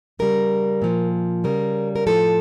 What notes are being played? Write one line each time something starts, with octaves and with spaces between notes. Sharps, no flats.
C#3 G3 A#4
A#2 F3
C#3 G3 A#4
A#4
A2 F3 A4